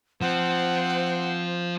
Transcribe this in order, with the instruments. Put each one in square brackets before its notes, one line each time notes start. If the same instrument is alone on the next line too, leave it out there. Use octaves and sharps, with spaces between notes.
[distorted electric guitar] F3 [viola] C4 [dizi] F#5